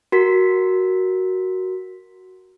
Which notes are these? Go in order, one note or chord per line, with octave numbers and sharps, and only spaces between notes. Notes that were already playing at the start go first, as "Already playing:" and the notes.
F#4 A#4 B6